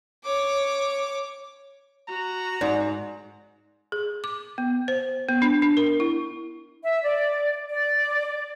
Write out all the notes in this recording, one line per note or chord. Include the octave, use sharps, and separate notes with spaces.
C#5 D6
F#4 A#5
G#2 D5
G#4
D6
B3
C5
B3
D4
D4
A#4
E4
E5
D5
D5